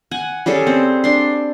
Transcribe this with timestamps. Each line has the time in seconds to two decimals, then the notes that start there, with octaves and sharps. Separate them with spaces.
0.11 F#5 G#5
0.46 G3 C#4 G#4 A4
0.67 C4
1.04 D4 C6